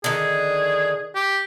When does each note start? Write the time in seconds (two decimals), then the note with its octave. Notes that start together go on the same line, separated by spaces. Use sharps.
0.04 D3 D#3 G#4
1.15 G4